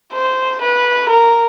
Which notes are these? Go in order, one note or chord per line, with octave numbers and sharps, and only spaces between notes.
C5
B4
A#4